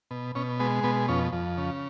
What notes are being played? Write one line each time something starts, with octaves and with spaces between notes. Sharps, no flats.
B2
B2 C#4
G#3 B3
B2 B3
F2 C#4
F2
C#3